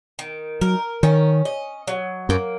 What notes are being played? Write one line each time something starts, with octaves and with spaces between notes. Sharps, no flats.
D#3
F#3 A#4
D#3 C#4
D#5
F#3
F#2 A#3